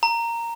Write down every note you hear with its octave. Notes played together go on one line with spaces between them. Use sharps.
A#5